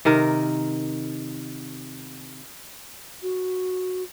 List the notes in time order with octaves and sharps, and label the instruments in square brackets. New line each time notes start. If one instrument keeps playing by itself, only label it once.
[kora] C3 D#3 A#4
[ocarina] F#4